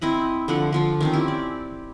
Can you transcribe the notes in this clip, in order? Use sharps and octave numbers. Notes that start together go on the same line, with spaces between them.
C4 E4 D#5 B5
D3 F3 F#5
D3 F3 F4
D#3 C4 C#4
E4 G4
D5